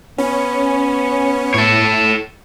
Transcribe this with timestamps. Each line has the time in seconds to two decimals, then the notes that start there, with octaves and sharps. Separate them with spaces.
0.18 B3 C#4
1.54 A2 A4 C#5